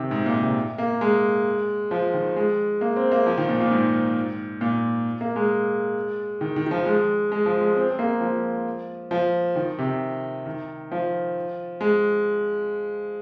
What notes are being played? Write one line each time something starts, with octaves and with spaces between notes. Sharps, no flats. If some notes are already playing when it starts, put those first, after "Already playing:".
Already playing: C3 D#3
G#2
A#2
C3
A#3
G#3
F3
D#3
G#3
A#3
C4
A#3
F3
D#3
A#2
A#2
G#2
A#2
A#3
G#3
D#3
D#3
D#3
F3
G#3
G#3
F3
G#3
C4
C4
A#3
F3
F3
D#3
C3
D#3
F3
G#3